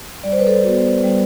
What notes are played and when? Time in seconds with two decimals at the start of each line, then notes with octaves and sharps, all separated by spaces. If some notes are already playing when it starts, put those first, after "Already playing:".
0.23 G3 D5
0.32 C5
0.39 B4
0.47 A4 C5
0.63 B3 F#4
1.03 G3